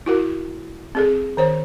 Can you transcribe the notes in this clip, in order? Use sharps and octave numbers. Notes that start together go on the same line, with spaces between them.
E4 F#4 A#4
C4 G#4 A4
D#3 C5 C#5